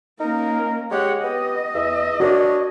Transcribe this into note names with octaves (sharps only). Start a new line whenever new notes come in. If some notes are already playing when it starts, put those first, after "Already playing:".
A#3 C#4 D#4 A#4
G#3 G4 C#5 F#5
B3 G4 D#5
E2 E5
D4 F#4 A#4 C#5 D5